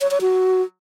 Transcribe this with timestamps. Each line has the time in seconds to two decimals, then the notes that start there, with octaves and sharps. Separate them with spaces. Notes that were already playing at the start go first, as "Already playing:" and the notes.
0.01 C#5
0.11 C#5
0.21 F#4